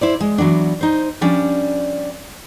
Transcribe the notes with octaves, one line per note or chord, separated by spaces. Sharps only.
E4 C5 D5
G#3
E3 F#3 B3 D4
D#4 C5
F3 G3 C#4 D4 D5